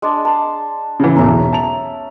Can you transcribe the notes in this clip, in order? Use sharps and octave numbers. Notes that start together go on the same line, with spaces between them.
G#3 D4 A5
A5 C6
C#3 E3
B1 E2 C#4 E5 A#5
A5 F7